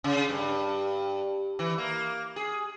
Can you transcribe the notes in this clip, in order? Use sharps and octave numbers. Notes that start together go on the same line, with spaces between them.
C#3
G2
E3
A#3
G#4